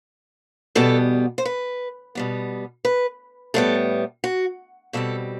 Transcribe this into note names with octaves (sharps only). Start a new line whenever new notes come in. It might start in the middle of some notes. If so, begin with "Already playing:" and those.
E2 B2 G3 B3 A4
C5
B4
B2 G3 B3
B4
A2 G3 B3 A4
F#4
B2 G3 C4 A4